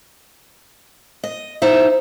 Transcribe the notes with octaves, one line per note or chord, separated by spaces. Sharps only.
D#5
D#4 E4 C5 E5